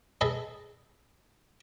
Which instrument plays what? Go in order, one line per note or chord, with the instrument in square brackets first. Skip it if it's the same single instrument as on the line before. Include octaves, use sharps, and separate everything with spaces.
[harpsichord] G#4 A4 B4 D#5